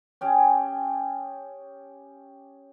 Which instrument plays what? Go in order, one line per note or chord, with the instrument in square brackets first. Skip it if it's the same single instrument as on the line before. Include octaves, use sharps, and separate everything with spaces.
[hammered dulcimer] C#4 G4 G#4